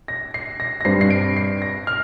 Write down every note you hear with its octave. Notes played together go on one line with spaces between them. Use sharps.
A#6
C7
A#6
A#6
G2 G3 C4 C7
C7
D7
C7
A#6
F6